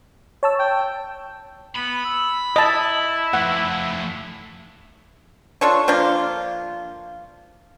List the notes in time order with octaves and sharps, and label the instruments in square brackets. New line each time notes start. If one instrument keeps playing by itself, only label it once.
[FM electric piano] C#5 A5 E6
[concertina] G5
[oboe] B3 [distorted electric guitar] B5
[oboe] E6
[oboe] E4 [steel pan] D#5 A5
[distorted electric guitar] F3 A3 [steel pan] F#5
[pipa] D4 F4 A4 C#5
F3 A#3 D4 F4